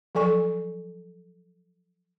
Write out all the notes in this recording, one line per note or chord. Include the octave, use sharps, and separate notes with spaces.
F3 F#3 A4 G#5 C#6